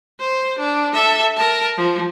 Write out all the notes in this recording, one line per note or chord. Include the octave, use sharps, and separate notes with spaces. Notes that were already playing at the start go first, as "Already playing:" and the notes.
C5
D4
A4 E5
A#4 A5
F3